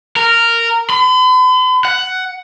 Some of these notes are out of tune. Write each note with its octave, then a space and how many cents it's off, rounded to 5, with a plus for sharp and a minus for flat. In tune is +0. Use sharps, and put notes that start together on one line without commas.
A#4 -10
B5 +45
F#5 +10